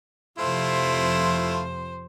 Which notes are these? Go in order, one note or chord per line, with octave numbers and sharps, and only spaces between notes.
F2 C3 F3 A3 E4 F4 C5